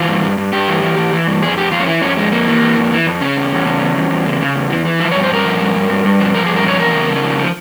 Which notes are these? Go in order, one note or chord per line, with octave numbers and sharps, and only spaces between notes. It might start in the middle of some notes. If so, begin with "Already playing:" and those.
Already playing: E3 F4
G2
G2
G2
G2 G4
E3
E3
E3
E3
G2
F2 G#4
F2 G4
F2 F4
C#4
E3 E4
F2 C#4
F2 G#3
F2 A#3
E3
E3
F2
E3
F2
C#3 C#4
E2
E2
C#3
E2
E2
E2
C#3
C#3
E2
E3
E3
F3 E4
C#5
G2
C5
G2 A#4
F3
G2
G2
G2
G2
F3
F3 A#4
G#4
G2
A#4
F3 C#5
E2 A#4
C#3
C#3
F3
F3